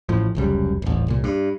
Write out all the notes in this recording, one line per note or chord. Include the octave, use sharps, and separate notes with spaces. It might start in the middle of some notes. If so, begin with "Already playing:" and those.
A1 A2 F3
F1 C#2 F#2 G3
D#1 A1
C2 A#2
G2